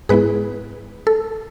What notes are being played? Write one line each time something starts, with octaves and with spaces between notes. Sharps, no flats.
G#2 G#3 B3 E4 G#4 B4
A4